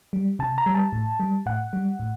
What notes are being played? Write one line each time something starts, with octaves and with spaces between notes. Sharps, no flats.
G3
C3 A5
A#5
G3
A5
A2
G3
A2 F#5
G3
A2